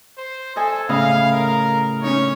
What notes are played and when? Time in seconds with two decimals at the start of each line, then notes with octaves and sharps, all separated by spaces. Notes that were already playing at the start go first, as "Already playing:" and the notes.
0.18 C5
0.56 A4 D#5 G#5
0.89 A2 C#3 D#5 F5
1.33 A#4
2.03 C#4 D#4 C#5